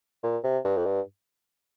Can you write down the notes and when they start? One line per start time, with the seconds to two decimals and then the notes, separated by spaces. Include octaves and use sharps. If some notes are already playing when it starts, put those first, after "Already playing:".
0.23 A#2
0.44 C3
0.65 G2
0.77 F2
0.86 G2